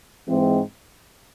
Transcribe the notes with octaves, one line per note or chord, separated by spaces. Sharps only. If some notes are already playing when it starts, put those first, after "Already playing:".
G#2 E3 G#3 C4